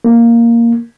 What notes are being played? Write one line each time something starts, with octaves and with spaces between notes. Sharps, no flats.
A#3